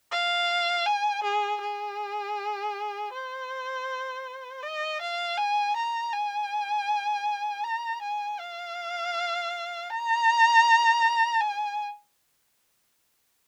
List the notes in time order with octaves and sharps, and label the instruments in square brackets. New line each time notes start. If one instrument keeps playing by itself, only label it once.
[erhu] F5
G#5
G#4
G#4
C5
D#5
F5
G#5
A#5
G#5
A#5
G#5
F5
A#5
G#5